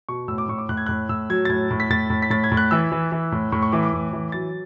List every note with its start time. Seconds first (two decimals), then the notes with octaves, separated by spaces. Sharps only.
0.09 B2 C#6
0.28 A2 E6
0.38 D6
0.48 A2 C#6
0.58 D6
0.69 A2 F#6
0.77 G#6
0.86 A2 F#6
1.09 A2 E6
1.30 F#3 G#6
1.45 A6
1.49 A2 G#6
1.71 A2
1.80 B6
1.90 A2 A6
2.10 A2
2.22 B6
2.30 A2 A6
2.44 G#6
2.52 A2
2.57 F#6
2.71 E3 E6
2.92 E3
3.12 E3
3.32 A2
3.52 A2 C#6
3.63 C#6
3.72 E3 D6
3.83 D6
3.93 A2
4.13 E3
4.32 F#3 A6